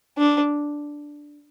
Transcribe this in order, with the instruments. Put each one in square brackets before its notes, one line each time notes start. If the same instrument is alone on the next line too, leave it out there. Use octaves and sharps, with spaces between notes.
[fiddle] D4